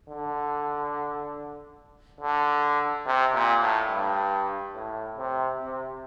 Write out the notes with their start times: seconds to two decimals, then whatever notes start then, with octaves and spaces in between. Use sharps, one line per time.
0.10 D3
2.21 D3
3.06 C3
3.34 A#2
3.62 A2
3.90 G2
4.75 A2
5.18 C3
5.61 C3